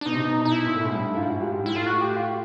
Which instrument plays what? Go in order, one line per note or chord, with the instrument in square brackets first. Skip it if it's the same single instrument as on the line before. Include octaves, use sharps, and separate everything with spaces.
[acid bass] D4
[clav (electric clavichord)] B2 [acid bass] D#4
[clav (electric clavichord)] C3
B2
[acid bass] D#4
E4
[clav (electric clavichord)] A#2
A2
G#2
G2
A2
[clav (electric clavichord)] G#2 [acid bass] F4
[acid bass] F#4
[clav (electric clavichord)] G#2 [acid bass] G4
[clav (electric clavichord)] G#2
[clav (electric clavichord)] G#2 [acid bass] E4
[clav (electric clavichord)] A2 [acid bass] F4
[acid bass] F#4
G4
F4